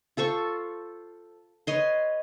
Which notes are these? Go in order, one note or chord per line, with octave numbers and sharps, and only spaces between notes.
F4 A4 C5 C#6
B4 C#5 D#5 C6